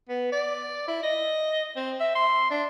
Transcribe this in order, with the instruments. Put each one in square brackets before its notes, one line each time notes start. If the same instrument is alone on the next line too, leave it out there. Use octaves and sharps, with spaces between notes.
[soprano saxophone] B3
D5
E4
D#5
C4
E5
C6
D4